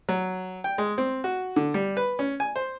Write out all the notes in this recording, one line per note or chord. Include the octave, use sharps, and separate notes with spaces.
F#3
G5
G#3
C4
F#4
D3
G3
B4
C#4
G#5
C5